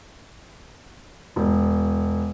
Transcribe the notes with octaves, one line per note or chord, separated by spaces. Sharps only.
E1